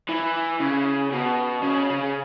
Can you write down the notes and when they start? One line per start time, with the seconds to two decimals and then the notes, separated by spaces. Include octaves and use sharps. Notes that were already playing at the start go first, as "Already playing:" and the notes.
0.09 E3
0.60 C#3
1.12 B2
1.63 C#3
1.90 C#3